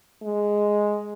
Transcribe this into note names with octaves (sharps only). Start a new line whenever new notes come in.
G#3